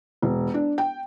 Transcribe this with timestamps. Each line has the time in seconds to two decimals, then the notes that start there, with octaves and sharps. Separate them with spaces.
0.22 E1
0.54 D4
0.78 G5